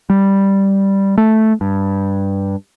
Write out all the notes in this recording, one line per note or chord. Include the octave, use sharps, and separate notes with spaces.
G3
A3
G2